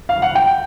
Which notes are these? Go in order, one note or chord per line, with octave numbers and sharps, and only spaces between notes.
F5
F#5
G5